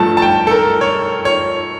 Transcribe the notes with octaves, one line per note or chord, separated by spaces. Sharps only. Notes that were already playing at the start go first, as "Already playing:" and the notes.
Already playing: G2 F3 A3 A5
A5
G5
A4
A#4
C#5
C#5